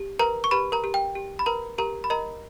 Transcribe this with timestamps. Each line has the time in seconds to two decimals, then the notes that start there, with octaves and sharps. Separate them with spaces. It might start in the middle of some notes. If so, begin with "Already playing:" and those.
Already playing: G4
0.19 A#4 B4 A#5
0.44 C#6
0.51 G4 B4 B5
0.72 A#4 A#5
0.84 G4
0.94 G5
1.15 G4
1.39 B5
1.46 A#4 B4 A#5
1.78 G4 A#4 A#5
2.04 B5
2.10 A#4 D#5 A#5